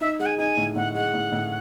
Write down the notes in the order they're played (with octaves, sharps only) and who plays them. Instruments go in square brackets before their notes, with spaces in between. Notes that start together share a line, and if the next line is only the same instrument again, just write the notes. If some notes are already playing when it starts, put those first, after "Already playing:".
[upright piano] D#4 [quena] E5
[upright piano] G#3 [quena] F#5
[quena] G#5
[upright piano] D#4 [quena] G#5
[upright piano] A2
[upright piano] A2 [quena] F#5
[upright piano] G#3 [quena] F#5
[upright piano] A2
A2